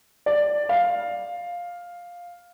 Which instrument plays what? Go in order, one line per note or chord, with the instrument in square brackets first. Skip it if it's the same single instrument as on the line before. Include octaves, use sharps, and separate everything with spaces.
[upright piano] D5
F5